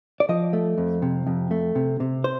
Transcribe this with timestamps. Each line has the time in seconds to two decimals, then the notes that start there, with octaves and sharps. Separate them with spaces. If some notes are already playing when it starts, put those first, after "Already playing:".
0.20 D5
0.29 F3 D#5
0.53 A3
0.78 F2
1.02 C3
1.27 F2
1.51 A3
1.75 C3
2.00 C3
2.24 C5